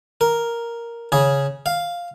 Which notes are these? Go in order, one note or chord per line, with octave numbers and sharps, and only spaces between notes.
A#4
C#3 G#4
F5